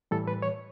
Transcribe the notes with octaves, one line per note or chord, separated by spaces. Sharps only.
A2 E3 G3 A4
B4
C#5